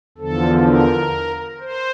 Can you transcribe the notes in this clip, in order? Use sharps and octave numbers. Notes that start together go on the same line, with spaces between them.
E2 D3 F3 A4
A#4
C5